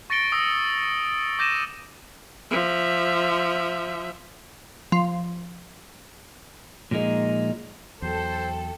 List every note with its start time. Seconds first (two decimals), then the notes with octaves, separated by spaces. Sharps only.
0.10 C#6 A6 A#6 C#7 D7 G7
0.32 D#6 E6 A#6
1.39 D6 G6 A#6 D#7 E7
2.51 F3 E5
4.92 F3
6.91 A#2 F3 G#3 D#4
8.02 E2 F#3 A4 C5 G5